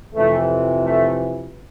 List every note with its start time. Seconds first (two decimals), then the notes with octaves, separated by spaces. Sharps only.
0.15 F2 C3 E3 A3
0.83 A3